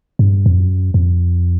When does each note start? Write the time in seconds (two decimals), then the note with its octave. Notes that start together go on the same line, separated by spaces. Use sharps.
0.19 G2
0.46 F2
0.57 F#2
0.94 F2